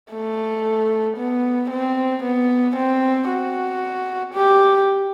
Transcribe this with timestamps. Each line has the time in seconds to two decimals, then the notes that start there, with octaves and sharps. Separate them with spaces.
0.12 A3
1.17 B3
1.70 C4
2.23 B3
2.76 C4
3.28 F#4
4.34 G4